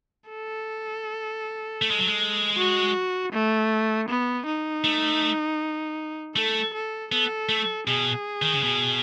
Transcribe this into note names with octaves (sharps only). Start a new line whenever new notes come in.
A4
A3
G#3
F#3
G#3
F#4
A3
B3
D#4
A3
A3 A4
A4
B3 A4
A3
B2 G#4
D#3
C#3
B2